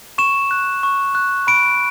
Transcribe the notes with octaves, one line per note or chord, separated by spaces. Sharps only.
C#6 E7
F#6
C#6
F#6
B5 D7